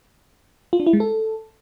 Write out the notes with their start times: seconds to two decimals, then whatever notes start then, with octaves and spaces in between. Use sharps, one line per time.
0.73 F4
0.80 D4
0.86 E4
0.93 G#3
1.00 A4